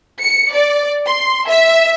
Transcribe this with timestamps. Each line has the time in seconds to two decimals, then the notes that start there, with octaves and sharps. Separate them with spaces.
0.22 C#7
0.55 D5
1.07 C6
1.48 E5